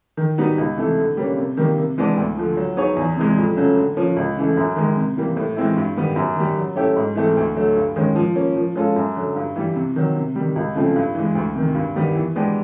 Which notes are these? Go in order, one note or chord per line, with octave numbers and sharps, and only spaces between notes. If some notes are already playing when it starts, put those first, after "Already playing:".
D#3
G3 B3 D#4 F#4
C#2
C3 E3 A3
D3
G3 A#3 C#4
C3
D#3 G3 A#3
C3
E3 G#3 B3 D4
D2
D3 F3
F#3
B3 D#4 G#4 C#5
E2
C3 E3 G#3
F2
C#3 F#3 A3
D3
F3 A#3 C#4
C#2
C#3 E3 A3
F#2
D#3 G#3
C3
E3 G3 A#3
A2
E3 G#3 C4 E4
G2
D#3 G3 B3
F#2
D#3 G3
F#3
A3 C#4 E4 G4
G#2
E3 A3 C4
D2
D3 F#3 A3
G2
D#3 G#3 C#4
F3
A#3 C#4
F3
G#3 C#4 F4 A4
F#2
D3 F#3
G2
E3 G3
C3
D#3 F#3
C3
D#3 G3
C#2
C#3 F3 A3 C4
G2
E3 G#3
D2
C3 D#3
G2
D#3 G3 B3
E3
G#3 B3 D4 G4